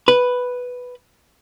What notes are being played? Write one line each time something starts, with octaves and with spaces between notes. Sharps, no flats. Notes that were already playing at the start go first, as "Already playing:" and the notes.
B4